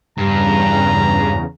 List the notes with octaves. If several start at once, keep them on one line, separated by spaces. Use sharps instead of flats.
E2 G2 C#3 A#5